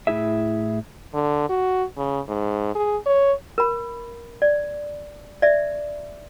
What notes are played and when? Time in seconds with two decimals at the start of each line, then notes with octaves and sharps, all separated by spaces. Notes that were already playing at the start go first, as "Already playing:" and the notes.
0.07 A2 C#4 E4 G#4 E5
1.14 D3
1.50 F#4
1.97 C#3
2.28 G#2
2.75 G#4
3.06 C#5
3.58 A#4 B5
4.42 D5
5.42 D5 E5